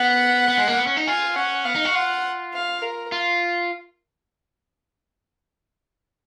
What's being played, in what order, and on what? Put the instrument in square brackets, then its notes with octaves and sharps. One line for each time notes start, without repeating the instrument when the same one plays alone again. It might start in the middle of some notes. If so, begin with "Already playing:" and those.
Already playing: [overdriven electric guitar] B3 [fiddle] F#5
[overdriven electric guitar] B3
G#3
A#3
B3
C#4
D#4
[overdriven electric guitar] F4 [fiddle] G#5
[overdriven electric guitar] C#4 [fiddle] F#5
[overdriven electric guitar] B3 [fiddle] F5
[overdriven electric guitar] D#4
F#4
[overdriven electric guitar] F4 [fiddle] F#5
[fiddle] F5
A#4
[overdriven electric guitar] F4